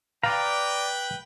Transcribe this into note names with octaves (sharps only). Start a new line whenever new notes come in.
B4 D5 F5 G5 A#5